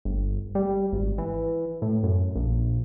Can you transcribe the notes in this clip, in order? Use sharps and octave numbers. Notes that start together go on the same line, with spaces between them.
G1
G3
G#1
E3
A2
F#2
A#1